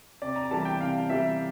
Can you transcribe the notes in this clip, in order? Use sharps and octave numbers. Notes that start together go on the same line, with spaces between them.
C3 D5
A#5
E3 G3 A5
G5
C3 F5
E3 G3 E5